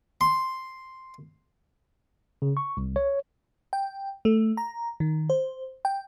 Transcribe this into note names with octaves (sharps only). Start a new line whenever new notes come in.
C6
C#3
C#6
C2
C#5
G5
A3
A#5
D#3
C5
G5